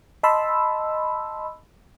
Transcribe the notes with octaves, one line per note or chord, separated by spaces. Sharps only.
D#5 A5 B5 C6 E6